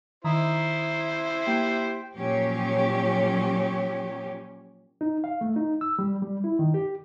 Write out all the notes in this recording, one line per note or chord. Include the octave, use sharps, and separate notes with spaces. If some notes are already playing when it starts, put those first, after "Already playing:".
D#3 E4 C5 A#5 D#6
A#3 G4 G5
A#2 F3 F#3 C#4 G4 C#5
D#4
F5
A3
D#4
E6
G3
G3
E4
D#3
G4